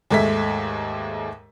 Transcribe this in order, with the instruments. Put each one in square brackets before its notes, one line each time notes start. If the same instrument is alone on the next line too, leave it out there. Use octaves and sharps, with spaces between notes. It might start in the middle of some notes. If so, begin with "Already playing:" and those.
[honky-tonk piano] D#2 G#2 G#3 A3 E5 B6